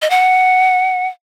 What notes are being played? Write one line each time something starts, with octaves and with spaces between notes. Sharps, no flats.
D#5
F#5